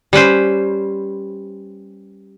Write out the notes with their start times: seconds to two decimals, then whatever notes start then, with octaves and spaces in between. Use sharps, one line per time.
0.13 G3 C#4 B4 C5